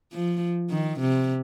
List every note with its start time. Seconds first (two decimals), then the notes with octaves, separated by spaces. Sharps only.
0.12 F3
0.70 D#3
1.00 C3